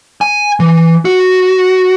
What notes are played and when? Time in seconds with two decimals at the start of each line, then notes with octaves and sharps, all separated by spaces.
0.21 G#5
0.60 E3
1.05 F#4